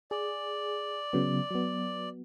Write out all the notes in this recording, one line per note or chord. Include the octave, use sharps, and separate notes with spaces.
G#4 D5
C#3 F#3 B3
F#3 B3